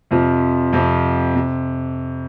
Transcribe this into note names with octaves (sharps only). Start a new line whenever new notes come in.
F2 C3 F3
F2 C3 F3
C3